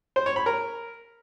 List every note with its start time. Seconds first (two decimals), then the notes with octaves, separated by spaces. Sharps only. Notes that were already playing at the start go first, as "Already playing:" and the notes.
0.16 C5
0.26 C#5
0.36 B5
0.46 A#4